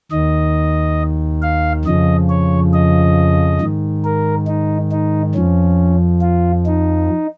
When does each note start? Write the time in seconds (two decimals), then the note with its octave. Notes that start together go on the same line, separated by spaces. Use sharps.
0.11 D#2 D#3 D#5
1.42 F5
1.85 F2 C#3 F3 D#5
2.30 C#5
2.73 D#5
3.61 G#2 D#3
4.04 A#4
4.47 D#4
4.92 D#4
5.35 F2 F3 C#4
6.21 F4
6.66 D#4